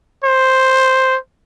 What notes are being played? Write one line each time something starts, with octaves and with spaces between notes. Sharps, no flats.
C5